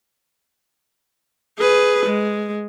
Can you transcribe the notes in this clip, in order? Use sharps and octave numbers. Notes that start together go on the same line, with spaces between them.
G#4 B4
G#3